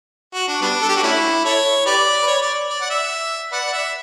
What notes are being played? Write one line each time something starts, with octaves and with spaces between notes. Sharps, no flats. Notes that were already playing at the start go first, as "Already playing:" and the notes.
F#4
D4
G3 B3 D4
A4
G4
F#4
A3 C#4 E4
E4 A4 C#5
G4 B4 D5
B4
C#5
D5
D5
F#5
E5
B4 D5 F#5
D5
E5